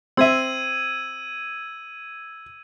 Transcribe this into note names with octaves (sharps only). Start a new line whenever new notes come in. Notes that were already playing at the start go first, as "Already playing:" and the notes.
C4 E5 E6 G#6 D#7